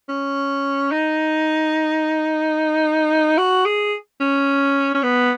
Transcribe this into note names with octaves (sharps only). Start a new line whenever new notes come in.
C#4
D#4
F#4
G#4
C#4
C#4
B3